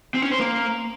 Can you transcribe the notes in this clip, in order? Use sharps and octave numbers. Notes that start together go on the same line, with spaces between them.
C4
C#4
C5
A#3